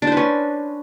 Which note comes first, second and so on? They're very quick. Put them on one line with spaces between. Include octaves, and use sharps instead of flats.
D4 C5 B4 C#4